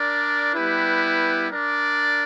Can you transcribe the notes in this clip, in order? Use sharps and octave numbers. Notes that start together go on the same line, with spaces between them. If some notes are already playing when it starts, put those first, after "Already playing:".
Already playing: D4 A#4 D5
G3 B3 E4 G4 B4
D4 A#4 D5